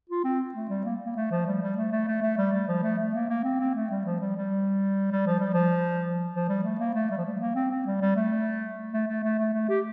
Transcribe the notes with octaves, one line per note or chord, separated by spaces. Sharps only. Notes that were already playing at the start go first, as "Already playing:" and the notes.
F4
C4
A3
G3
A#3
A#3
A3
F3
G3
G3
A3
A3
A3
A3
G3
G3
F3
A3
A3
A#3
A#3
C4
C4
A3
G3
F3
G3
G3
G3
F3
G3
F3
F3
G3
A3
A#3
A3
G3
F3
G3
A#3
C4
C4
G3
G3
A3
A3
A3
A3
A3
A3
G4